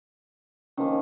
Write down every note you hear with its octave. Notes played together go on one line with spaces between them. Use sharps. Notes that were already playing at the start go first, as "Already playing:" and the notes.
D#3 F3 A#3 C#4